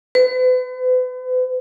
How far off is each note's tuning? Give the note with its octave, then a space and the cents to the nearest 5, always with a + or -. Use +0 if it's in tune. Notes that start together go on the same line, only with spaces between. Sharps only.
B4 +40